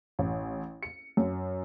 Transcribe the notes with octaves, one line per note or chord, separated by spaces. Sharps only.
A1
C#7
F#2